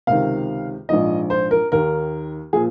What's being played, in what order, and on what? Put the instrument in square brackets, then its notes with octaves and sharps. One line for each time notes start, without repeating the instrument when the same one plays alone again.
[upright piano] C#2 C3 D#3 F5
A#1 G#2 F3 D#5
C5
A#4
D#2 D#3 A#4
A#2 F3 G#4